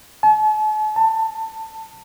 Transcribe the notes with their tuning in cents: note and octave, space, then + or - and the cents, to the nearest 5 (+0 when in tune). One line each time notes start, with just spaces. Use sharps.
A5 -45
A5 +20